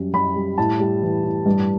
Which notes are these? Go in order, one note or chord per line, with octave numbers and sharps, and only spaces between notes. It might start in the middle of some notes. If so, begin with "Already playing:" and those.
Already playing: F#2 G3
F#2 B5
G3
A2 A5
G3
E3
A2
G2